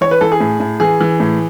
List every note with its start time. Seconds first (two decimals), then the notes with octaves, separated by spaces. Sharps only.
0.01 E3 C#5
0.11 B4
0.21 E3 A4
0.32 G#4
0.40 A2
0.60 A2
0.80 E3 G#4
1.01 E3
1.20 A2